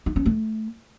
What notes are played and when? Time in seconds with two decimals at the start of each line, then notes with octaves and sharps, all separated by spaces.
0.06 D#4
0.16 C#4
0.26 A3